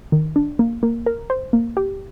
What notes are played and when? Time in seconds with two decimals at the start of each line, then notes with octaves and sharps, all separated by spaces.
0.12 D#3
0.36 D4
0.59 A#3
0.83 A#3
1.06 A#4
1.30 C5
1.53 A#3
1.77 G4